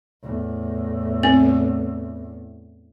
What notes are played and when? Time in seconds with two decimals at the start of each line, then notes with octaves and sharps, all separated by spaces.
0.23 E2 A2
1.23 C4